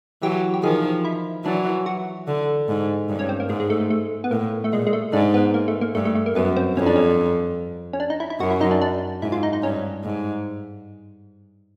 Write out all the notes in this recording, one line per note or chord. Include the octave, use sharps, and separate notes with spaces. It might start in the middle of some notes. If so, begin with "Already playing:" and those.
E3 F#3 G4
G4
D#3 F3 G#4
E4
E3 F#3 D4
F#4
D3
G#2
G2
C#4
C4
A#3
G#2 G#3
G#3
A3
A3
A3
B3
A2 A#3
A3
A#2 G#3
G#3
A3
G#2 D4
B3
A#3
A3
A#3
G2 A3
A3
A3
A#3
F#2 B3
C4
F2 C#4
D4
C#4
C#4
D4
D#4
E4
E4
F#2 F#4
E4
D#4
D4
D4
G#2 E4
F4
D#4
D#4
G2 C#4
G#2